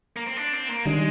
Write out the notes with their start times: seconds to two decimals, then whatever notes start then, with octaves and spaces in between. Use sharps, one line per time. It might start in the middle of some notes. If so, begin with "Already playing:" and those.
0.16 A#3
0.26 C4
0.37 D4
0.53 C4
0.69 A#3
0.85 D#3 G3 G#3 D4